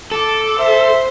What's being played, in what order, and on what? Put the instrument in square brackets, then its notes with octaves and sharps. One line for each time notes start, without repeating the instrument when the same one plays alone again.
[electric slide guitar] A4 [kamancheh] D6
[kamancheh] C5 [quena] E5